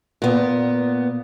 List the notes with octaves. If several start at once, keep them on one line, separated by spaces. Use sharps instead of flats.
A#2 B3